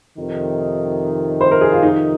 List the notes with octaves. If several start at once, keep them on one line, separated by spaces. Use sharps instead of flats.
F2 C3 D#3
C5
A#4
G#4
F4
D#4